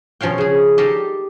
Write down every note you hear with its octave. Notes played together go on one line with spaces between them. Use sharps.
B2 F3 C#4 F5 G5
C#3 G#4
D#4 G4 A4 D5 D#5 F5